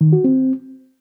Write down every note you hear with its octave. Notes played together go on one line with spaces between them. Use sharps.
D#3
F#4
C4